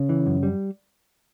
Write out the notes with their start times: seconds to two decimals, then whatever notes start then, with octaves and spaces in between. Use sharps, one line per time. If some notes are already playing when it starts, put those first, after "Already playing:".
Already playing: C#3
0.09 E3
0.26 F#2
0.43 G3